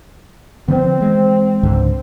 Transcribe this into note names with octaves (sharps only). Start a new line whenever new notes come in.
D3 F3 B3 C4
E3 G#3
C#2 G#2 D3